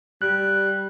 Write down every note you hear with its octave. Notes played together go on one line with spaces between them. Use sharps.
G3 F#6